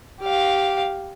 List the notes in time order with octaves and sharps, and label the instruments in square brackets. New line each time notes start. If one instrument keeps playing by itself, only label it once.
[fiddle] G4 F5